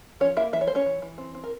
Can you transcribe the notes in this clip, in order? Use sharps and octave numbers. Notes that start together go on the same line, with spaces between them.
F3 C#4 C#5
A#3 E4 E5
E3 E5
C#5
A#3 C5
C#4 C#5
E3
E3
C4
C4
A#4